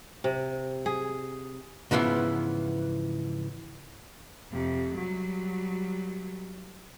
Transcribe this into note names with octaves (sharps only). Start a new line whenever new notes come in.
C3
G#4
G#2 C#3 E3 F3 B3
F2 C3
F#3 G3